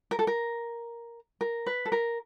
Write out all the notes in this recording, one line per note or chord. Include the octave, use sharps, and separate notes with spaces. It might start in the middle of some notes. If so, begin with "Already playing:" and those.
A#4
A4
A#4
A#4
B4
A4
A#4